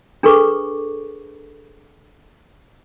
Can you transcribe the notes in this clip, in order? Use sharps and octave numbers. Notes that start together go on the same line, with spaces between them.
D4 G#4 A4 B4 C#6 D6